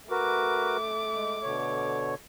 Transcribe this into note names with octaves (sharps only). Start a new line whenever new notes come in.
A3 F#4 A#4 B4 D6
G#3
B2 D3 C#5